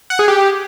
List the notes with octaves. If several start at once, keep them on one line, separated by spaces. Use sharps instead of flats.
F#5
G#4
G4